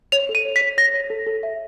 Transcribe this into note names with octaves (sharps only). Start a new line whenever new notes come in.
C#5 F7
A4
D#7
C#5
B6
C#5
C#5 A#6
C#5
A4
A4
E5